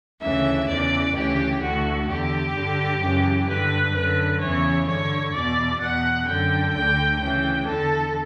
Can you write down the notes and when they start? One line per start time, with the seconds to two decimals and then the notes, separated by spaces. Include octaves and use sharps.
0.21 D2 C#3 E3 E5
0.67 E2 C#3 E3 D5
1.14 D2 C#3 E3 G4
1.61 D2 D3 F#4
2.07 E2 D3 G4
2.54 G2 D3
3.00 F#2 C#3 E3
3.47 G2 D3 B4
3.94 F#2 D3 B4
4.40 E2 C#3 E3 C#5
4.86 G2 D3 C#5
5.33 E2 B2 D5
5.79 E2 B2 F#5
6.26 F#2 D3 G5
6.73 D2 D3 G5
7.19 D2 C#3 E3 G5
7.66 E2 D3 A4